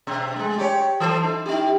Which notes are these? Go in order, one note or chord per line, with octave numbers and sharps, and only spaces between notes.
B2
G#3 A3
G4 C#5
E3 A4 C5
D#4
D#4 G4